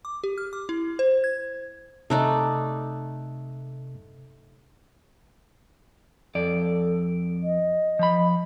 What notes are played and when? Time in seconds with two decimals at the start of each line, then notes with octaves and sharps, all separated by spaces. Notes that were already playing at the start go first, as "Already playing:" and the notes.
0.05 D6
0.24 G4
0.38 F6
0.53 D6
0.69 E4
0.99 C5
1.24 G#6
2.10 C3 A3 D#4 D5 E6 F#6
6.35 F2 A4 D5
7.43 D#5
7.99 F3 B5